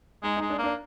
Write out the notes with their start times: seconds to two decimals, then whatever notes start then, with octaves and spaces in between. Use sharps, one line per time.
0.23 G#3 D#4
0.37 D#4
0.41 G#3
0.50 D4
0.58 A#3
0.64 D4